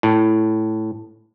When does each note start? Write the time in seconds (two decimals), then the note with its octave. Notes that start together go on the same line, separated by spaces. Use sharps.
0.03 A2